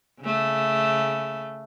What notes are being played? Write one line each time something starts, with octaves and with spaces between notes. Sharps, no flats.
C#3 A3